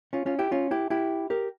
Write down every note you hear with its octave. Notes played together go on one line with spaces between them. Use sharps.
C#4 F4
C#4 F4
E4 G4
C#4 F4
E4 G4
E4 G4
G4 A#4